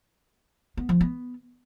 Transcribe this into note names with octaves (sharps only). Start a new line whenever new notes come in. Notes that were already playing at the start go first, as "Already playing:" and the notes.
B3
F3
B3